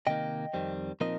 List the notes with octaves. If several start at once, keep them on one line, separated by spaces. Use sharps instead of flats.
C3 D#3 A#3 D#4 D#5 G5
F2 D#3 G3 C4
A#2 F3 C4 D#4 A#4 D#5